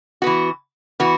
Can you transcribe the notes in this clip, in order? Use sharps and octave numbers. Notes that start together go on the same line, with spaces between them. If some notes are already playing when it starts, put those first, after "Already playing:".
E3 B3 F#4
E3 B3 F#4